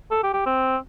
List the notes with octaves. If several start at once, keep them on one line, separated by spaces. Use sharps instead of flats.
A4
G4
G4
C4